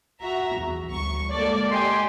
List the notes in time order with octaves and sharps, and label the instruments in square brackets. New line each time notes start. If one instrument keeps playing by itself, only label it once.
[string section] F#4 E5 A#5
E2
G1 D2 C#6
[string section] G#3 A#3 A4 [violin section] D5
[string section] G4 [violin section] D#5 G5 G#5 [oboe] C6